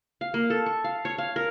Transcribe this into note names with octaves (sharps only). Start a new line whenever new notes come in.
F5
A#3
A4
C#6
F5
C#5
F5
A#4